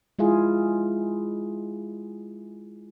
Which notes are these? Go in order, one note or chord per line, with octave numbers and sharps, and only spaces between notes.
G#3 E4 F4 G#4